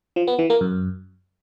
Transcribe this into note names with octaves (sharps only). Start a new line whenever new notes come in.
F3
B3
E3
A#3
F#2